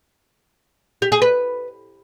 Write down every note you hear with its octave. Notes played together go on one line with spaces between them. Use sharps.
G4
G#4
B4